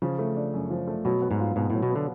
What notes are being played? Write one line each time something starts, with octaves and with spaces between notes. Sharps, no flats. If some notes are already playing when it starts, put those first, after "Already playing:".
C#3 F3
A3
D4
F#2
F3
A3
B2 F#3
B3
G#2
F4
G#2 B2
A2 F#3
B2
D3 B3